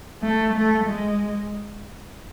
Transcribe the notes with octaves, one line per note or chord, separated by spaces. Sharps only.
A3
A3
G#3